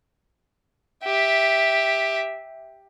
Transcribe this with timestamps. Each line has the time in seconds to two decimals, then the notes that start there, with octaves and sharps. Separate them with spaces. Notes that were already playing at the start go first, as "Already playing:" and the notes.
1.04 G4 E5